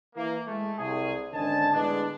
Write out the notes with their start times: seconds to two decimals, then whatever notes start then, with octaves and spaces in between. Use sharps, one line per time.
0.16 E3 A#3
0.47 G#3 A3
0.78 C2 G#4
1.33 G#1 D3 C#4 D#5 G#5 A5
1.74 A2 D3 G#3 B3 D4